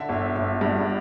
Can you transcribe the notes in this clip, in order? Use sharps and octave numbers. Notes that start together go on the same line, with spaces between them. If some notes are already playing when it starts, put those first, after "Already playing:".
Already playing: D3 E5
G1
G1
G2